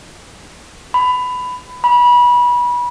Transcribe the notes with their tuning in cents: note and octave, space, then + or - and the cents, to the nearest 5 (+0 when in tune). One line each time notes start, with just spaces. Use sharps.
B5 +20
B5 -25